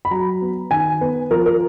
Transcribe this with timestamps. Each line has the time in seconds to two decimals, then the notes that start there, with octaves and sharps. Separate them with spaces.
0.05 B5
0.11 F#3 A#5
0.41 B3
0.71 D#3 G#5
1.01 B3 B4
1.31 F3 A#4
1.46 A#4